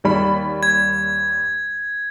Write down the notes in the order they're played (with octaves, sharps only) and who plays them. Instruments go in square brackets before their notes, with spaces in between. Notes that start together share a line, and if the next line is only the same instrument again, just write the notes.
[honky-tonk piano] D#2 G3 B5
[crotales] G#6